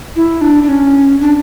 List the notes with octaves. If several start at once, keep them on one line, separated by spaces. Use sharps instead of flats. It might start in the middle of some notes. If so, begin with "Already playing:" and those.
E4
D4
D4
C#4
D4